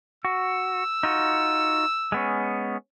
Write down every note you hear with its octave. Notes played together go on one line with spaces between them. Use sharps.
F#4 E6
D#4 F4 F#4
G#3 B3 C#4